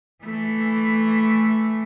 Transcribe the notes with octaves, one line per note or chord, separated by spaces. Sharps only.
E3 A3